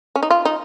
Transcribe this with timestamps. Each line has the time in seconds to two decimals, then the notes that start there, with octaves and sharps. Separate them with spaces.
0.16 C#4
0.23 D#4
0.30 F4
0.45 D#4